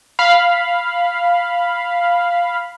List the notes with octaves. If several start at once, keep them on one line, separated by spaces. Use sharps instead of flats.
F5 B5